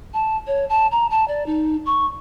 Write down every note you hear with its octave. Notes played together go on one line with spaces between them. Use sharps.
A5
C#5
A5
A#5
A5
D5
D#4
C#6